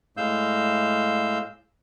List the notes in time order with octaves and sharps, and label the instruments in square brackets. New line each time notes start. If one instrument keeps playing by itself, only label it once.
[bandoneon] A2 G#3 F5 E6 G6